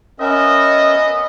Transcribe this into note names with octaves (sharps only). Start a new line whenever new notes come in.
B3 C#4 A#4 D#5 E5